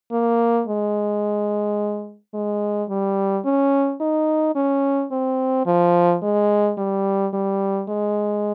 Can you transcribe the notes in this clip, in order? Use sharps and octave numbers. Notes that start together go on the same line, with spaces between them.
A#3
G#3
G#3
G3
C#4
D#4
C#4
C4
F3
G#3
G3
G3
G#3